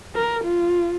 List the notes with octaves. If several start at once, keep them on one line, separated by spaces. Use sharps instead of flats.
A#4
F4